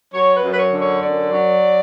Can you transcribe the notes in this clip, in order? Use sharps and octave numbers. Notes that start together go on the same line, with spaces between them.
F#3 C#5
B4
F#2
B4
C#5
D3
C#5
F#2 D5
F#3